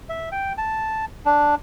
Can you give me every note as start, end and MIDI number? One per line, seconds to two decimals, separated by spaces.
0.09 0.29 76
0.32 0.53 79
0.58 1.05 81
1.25 1.55 62